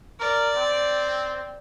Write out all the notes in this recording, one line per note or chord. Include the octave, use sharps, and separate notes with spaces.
A#4 D5
C4